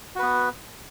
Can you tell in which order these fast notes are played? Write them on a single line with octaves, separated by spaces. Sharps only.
F#4 B4 B3